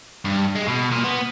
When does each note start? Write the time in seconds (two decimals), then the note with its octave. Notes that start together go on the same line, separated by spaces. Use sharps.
0.25 G2
0.56 G#3
0.68 B2
0.92 A#2
1.04 B3